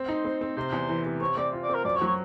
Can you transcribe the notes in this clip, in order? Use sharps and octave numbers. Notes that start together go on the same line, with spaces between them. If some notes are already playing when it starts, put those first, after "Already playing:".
Already playing: C4
D#4 C5
C4
C4
C3 C5
E2
E3
C3
C4 C#5
C4 D5
F4
D5
C4
A#4
F#2 D5
C#5
F#3
C#5